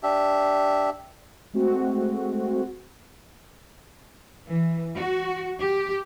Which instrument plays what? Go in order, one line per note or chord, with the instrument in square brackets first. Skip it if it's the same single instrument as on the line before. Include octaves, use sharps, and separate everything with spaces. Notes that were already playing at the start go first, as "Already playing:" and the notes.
[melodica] D4 G4 E5
[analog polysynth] G#3 A3 C4 F#4
[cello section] E3
F#4
G4